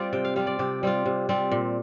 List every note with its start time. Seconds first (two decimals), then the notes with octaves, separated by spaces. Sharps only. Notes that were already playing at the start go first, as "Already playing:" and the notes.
Already playing: G3 C4 F4 C5 D5
0.13 C3 G5
0.25 F5
0.36 G3 C4 F4 F5
0.47 D5
0.59 C3 G4
0.83 G3 C4 F4
1.06 C3
1.29 G3 C4 F4
1.51 A#2